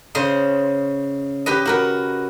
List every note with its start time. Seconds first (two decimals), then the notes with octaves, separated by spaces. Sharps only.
0.15 C#3 C5 D#5 C6
1.46 G4 B4 D#5
1.65 F#4 A#4 B4